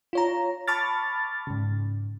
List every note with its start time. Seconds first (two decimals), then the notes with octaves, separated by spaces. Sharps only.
0.13 F4 C#5 A#5
0.67 A5 B5 C#6 D6 F6 A6
1.47 G#2 C#3